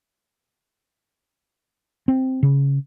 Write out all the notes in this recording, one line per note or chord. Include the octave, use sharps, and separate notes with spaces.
C4
C#3